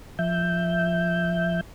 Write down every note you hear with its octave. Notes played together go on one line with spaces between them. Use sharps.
F3 E5 G6